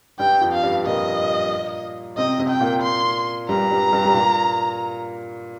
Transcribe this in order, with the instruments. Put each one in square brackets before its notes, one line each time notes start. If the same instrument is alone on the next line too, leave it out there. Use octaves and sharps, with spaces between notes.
[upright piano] G2 G3 [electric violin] G5
[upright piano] F2 F3
[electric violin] F5
[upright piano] G2 G3
[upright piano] A#2 A#3 [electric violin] D#5
[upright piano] C3 C4 [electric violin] D#5
[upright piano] C3 C4
[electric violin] G5
[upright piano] A#2 A#3
[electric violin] C6
[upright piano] G2 G3 [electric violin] A#5
[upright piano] G2 G3
G2 G3
G3
A#2 A#3